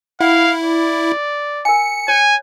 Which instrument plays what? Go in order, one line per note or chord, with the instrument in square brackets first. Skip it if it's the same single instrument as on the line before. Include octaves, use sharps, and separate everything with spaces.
[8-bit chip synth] E4 [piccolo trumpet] F5 [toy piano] F#5
[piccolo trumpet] D5
[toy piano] A#4 G#5 [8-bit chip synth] C#7
[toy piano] C#5 [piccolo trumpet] G#5